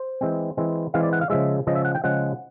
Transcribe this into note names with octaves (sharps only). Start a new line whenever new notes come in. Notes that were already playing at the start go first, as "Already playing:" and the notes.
Already playing: C5
E3 G#3 C4
E3 G#3 C4
E3 G#3 C4 F5
D5
F#5
F5
C#3 F3 G#3 E5
C#3 F3 G#3 D#5
E5
F#5
G5
C#3 F3 G#3 F#5